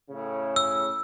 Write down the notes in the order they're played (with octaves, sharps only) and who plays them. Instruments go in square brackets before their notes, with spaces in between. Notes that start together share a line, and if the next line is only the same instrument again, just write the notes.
[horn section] A2 C#3
[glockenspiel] E6